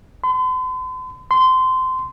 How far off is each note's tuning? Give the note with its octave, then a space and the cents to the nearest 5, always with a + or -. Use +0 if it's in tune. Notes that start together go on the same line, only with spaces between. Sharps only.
C6 -45
C6 -20